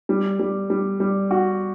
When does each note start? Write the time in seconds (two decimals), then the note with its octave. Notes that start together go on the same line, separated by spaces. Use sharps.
0.09 G3
0.40 G3
0.70 G3
1.00 G3
1.31 F#4